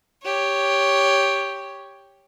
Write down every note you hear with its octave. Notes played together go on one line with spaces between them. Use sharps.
G4 C#5